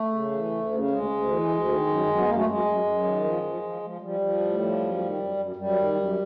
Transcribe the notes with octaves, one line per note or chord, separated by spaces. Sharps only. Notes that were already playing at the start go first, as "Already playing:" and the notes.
Already playing: A3
C#3
E3
D2
C#3
D2 G#3
D2
E3
D2
D#3
F#2
F#2
B3
F#2 A#3
A3
F#2 G#3
F#2
F#2
D#3
F3
F3
F3
F3
F3 G3
F3
A2
F3
F#2
D#3
F#2
F#2
F#2 G3
D#3
F#2